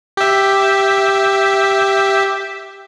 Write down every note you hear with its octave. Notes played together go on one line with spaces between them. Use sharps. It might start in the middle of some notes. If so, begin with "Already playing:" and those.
G4 E5